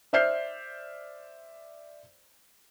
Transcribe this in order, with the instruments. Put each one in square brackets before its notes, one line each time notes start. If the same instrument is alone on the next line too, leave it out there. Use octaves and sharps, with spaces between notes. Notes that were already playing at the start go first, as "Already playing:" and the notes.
[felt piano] C5 D5 E5 F6 G6 C7